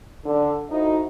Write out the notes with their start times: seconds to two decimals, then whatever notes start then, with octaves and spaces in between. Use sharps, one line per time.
0.25 D3
0.71 D#4 E4 F#4 A4 C5 D#5